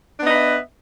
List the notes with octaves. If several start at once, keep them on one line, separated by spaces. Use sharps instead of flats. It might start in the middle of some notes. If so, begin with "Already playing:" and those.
B3 D4 B4 D#5 E5